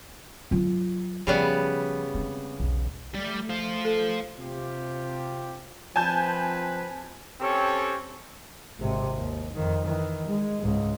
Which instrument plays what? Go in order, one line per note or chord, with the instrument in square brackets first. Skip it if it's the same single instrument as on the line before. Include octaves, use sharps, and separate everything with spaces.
[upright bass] F#3 F4
[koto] C#3 G3 B3 [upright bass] F3
[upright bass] C4 E4
B1 E2
[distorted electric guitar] G3 D5 [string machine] A3
[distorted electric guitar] F4 C5
[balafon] A4
[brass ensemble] C3 F4 G4
[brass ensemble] F3 C4 B4 [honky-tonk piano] G#5 A5 G6
[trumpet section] C4 C#4 G4 A4 C#5
[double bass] G#1 C3
D#2
F2 D#3
D#3 E3
G#3
C#2 G#2